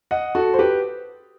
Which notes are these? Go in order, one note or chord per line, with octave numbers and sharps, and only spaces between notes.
D#5 F#5
F#4 A4
C5
G4 B4